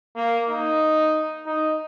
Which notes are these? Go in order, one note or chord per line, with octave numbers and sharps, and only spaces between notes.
A#3
D#4
D#4